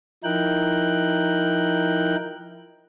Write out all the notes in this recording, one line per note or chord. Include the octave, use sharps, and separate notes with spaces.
F3 D#4 E4 A#4 G5 F#6